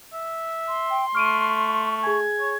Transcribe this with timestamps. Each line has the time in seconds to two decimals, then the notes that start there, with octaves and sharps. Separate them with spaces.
0.13 E5
0.68 C6
0.90 G5
1.15 A3 C#6 F6 D7 D#7
2.03 G#4 G#5 G#6
2.40 C#5